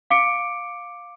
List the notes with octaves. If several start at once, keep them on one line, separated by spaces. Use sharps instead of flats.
F5 D6 C#7 D7